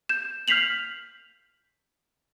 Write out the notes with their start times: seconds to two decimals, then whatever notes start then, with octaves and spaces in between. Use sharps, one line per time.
0.09 G6 E7
0.48 F6 G6 B6 C7 F7 F#7